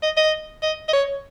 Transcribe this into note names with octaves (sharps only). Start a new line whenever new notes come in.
D#5
D#5
D#5
D#5
C#5